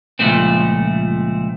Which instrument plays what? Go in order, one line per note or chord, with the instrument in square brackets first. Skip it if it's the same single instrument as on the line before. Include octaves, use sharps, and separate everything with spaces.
[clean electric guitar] C#2 A#2 D3 F3 A3 C4